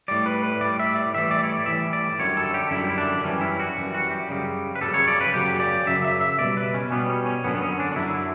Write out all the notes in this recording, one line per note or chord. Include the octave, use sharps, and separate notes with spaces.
A2 G3 D5
B4
B4
A2 G3 D5
E5
D5
A2 E3 G3 E5
D5
C#5
D5
A2 E3 G3 E5
D5
F#2 D3 G3 C#5
A4
G4
F#2 D3 G3 E4
D4
F#2 E3 G3 C#4
E4
F#4
F#2 E3 G3 F#4
F#4
G4
F#2 C#3 G3
B4
F#2 C#3 G3 A4
C#5
D5
B4
F#2 C#3 F#3 G4
D5
F#2 C#3 F#3 E5
E5
E5
B2 G3 D5
B4
C#4
B2 G3 B3
C#4
C#4
F#2 D3 F#3 B3
B3
C#4
D4
D4
F#2 D3 F#3 E4